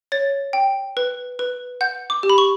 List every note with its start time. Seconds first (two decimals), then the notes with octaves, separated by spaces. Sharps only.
0.12 C#5 A6
0.53 G5
0.97 B4
1.39 B4
1.81 F#5 G6
2.10 D6
2.23 G4
2.30 B5
2.38 C#6